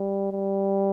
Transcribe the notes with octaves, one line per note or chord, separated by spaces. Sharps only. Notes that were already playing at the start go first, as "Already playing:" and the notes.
Already playing: G3
G3